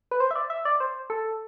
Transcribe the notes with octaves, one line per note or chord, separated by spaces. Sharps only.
B4
C5
E5
D5
E5
D5
C5
A4